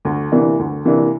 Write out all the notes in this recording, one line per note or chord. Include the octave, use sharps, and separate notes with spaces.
D2
C3 E3 A#3 D4
D2
C3 E3 A#3 D4